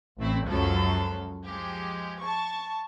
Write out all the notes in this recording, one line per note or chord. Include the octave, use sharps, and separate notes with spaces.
A1 A2 A3 C4 E4
C#2 F#2 F3 F#3 A4
F3 G#3 G4
A5 C#6